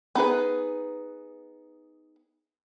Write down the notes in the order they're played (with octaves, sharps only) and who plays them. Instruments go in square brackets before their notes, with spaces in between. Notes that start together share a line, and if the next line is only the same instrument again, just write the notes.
[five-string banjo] B3 D#4 G#4 B4